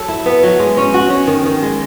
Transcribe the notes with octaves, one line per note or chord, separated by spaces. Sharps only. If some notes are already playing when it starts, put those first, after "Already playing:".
Already playing: F#3 A4
E4
B3
F#3
G#3
C#4
F#4
C#4
D#3
D#3
G#3